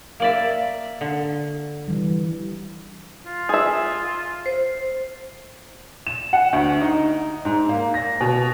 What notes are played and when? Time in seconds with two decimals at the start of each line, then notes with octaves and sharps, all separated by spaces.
0.20 A#3 D5 E5
1.01 D3
1.88 E3 G3
3.26 F4
3.49 G#4 E5
4.46 C5
6.07 E7
6.33 F#5
6.53 D2
6.81 D#4
7.45 G#2
7.69 A#3
7.94 A#6
8.21 B2